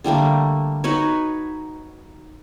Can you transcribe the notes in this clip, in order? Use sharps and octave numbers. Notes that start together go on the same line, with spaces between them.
D3 G3 A3 A#3
D#4 F#4 B4 C#5